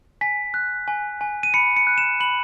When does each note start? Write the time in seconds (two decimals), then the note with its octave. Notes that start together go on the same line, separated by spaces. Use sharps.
0.21 G#5 B6
0.54 F#6
0.88 G#5
1.21 G#5
1.43 D#7
1.54 B5 C#7
1.76 C#7
1.87 F#6
1.98 E7
2.20 B5 F#7